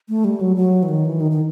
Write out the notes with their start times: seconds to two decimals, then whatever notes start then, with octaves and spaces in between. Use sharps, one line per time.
0.09 A3
0.24 G3
0.41 F#3
0.56 F#3
0.83 E3
0.89 D#3
1.05 E3
1.21 D#3
1.31 D#3